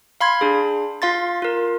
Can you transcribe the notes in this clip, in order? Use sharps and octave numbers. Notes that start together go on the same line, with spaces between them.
F5 B5 C6 G#6
D4 G#4
F4 F5 C6 A6
F4 A#4